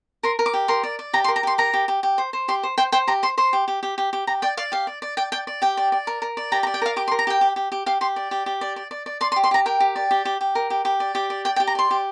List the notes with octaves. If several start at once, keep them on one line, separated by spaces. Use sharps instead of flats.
A#4 C6
A#4
D6
G4
A#4 C6
D5
D5
G4 A#5
C6
A#4
A#5
G4 C6
A#4 A#5
G4
G4
G4
C5
C5
G4 C6
C5
C5 G5
C5 G5
G4 A#5
C5 C6
C5 C6
G4
G4
G4
G4
G4
G4 A#5
D5 G5
D5 F5
G4 F5
D5
D5
D5 G5
D5 G5
D5
G4 G5
D5
D5
A#4
A#4
D5
G4 A#5
A#5
D5
G5
A#4 F5
G4 D6
C6
A#4
A#5
G4 G5
G4
G4
G4
G4 F5
G4 C6
D5
G4
G4
D5
D5
D5
D5
D5 C6
C6
G4
C6
G4 A#5
A#4 G5
G4
D5
G4
G4
G4
A#4
G4
G4
D5
G4
D5
D5 G5
G5
G4
A#5
D5 C6
G4